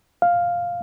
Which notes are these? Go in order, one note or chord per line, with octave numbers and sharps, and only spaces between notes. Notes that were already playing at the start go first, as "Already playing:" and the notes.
F5